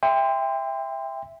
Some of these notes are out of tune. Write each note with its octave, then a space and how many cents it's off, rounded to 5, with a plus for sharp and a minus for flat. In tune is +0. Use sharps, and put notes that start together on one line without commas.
E5 +0 G5 +25 C6 -20